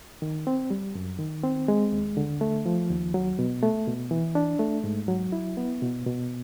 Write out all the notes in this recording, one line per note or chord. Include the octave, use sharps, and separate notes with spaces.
D#3
C4
G3
F#2
D#3
C4
G#3
D#2
D3
A3
F3
D#2
F#3
B2
A3
B2
E3
D4
A3
G#2
F#3
E4
B3
B2
B2